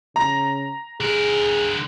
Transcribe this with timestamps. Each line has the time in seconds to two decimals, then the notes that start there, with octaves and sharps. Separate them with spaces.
0.16 C#3 A#5
1.01 D3 G#4 A#4